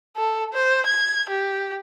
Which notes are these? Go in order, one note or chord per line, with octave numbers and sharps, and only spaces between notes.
A4
C5
G#6
G4